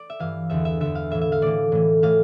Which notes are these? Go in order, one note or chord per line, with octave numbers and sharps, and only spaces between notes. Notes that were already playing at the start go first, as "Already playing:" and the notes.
Already playing: D5
E5
G2 E3 F5
E2 D3 E5
E5
E2 D3 E5
F5
A2 E3 E5
E5
F5
A2 E3 D5
A2 E3
A2 E3 F5